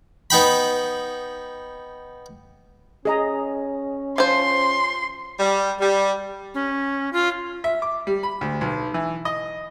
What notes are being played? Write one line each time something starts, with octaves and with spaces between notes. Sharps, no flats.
B3 D#4 G5 B5
C#4 G#4 D#5 A#5
F3 C5 C6
G3
G3
C#4
F4
E5
D6
G3
B5
D2
B1
E3
D#5